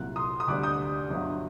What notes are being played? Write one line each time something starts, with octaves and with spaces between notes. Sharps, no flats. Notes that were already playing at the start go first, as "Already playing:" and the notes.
Already playing: C2 A#2 F#3 F#6
C6 D#6
D#6
D2 D3 G3 D6 F#6
D#6 G6
G1 G2 F#3